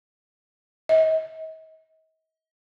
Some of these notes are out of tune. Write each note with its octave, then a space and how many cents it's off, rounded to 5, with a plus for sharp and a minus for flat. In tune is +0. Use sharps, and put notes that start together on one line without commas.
D#5 +40